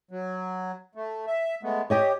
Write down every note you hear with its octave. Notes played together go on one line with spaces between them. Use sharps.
F#3
A3
E5
G#3 A3 B3
G4 C#5 D#5 G5